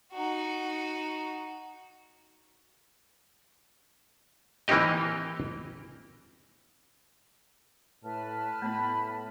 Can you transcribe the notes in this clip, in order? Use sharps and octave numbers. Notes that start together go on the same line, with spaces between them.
D#4 F#4
E3 A#3 C4 D#4 G4 D#5
A2 B4 A5 F6
A2 A3 B3 E4 B5